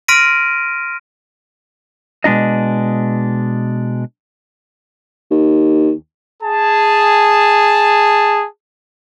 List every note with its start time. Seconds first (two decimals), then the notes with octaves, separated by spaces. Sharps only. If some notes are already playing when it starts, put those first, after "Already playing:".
0.08 C6 F6 A#6 B6 D7 D#7
2.24 B2 G#3 D4 D#4 D#5
5.31 D#2
6.43 G#4 A5